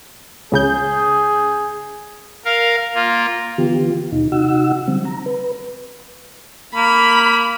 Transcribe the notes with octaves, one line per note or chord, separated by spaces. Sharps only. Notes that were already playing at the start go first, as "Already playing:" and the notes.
C#2 C#3 G#4 G6
A#4 F5
A#3 F4
D3 E3 B3 F4 G4
D#2 B2 D#4
C3 D#4 F#4 F#5 E6
D3 F#3 G3 C4
A#5
B4
A#3 B5